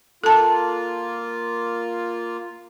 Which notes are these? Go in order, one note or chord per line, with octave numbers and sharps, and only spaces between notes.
A#3 F4 A4 A5